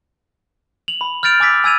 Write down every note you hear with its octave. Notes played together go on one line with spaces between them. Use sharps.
F7 F#7
B5
F6 G6 A6 D7 F7
G#5 D6 E6 A6 B6 D7
E6
G#5 E6 G#6 D#7 F7